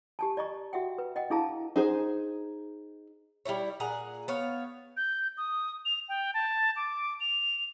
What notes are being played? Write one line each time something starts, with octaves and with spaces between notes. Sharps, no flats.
G4 G#5 A5
D5 D#5 A#5 C#6
F#4 E5 F#5 G5
B4
D#5 F#5 G5
D4 E4 G#4 F5 A5 A#5
D#4 G#4 C5
G3 D#4 E4 C#5
A#2 G#4 F#5 A#5
B3 C#5 F5
G6
D#6
F7
G5
A5
D6
F7